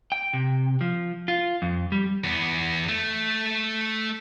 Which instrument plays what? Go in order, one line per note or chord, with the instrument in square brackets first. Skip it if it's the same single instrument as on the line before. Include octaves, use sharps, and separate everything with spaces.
[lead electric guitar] G5
C3
F3
F4
F2
G3
[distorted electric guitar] E2 B3
A3